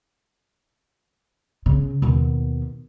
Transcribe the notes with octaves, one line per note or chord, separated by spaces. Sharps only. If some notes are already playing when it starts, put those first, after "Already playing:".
C#3
D#2 B2